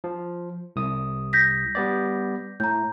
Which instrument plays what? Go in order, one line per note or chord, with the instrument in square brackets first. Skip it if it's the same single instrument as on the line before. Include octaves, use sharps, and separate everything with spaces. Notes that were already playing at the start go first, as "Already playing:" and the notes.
[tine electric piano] F3
C2 D#6
[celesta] G6 A#6 B6
[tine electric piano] G3 B3 D5
[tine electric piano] A2 [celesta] A#5 G6